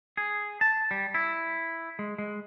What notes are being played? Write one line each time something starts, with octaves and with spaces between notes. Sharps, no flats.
G#4
A5
G3
E4
G#3
G#3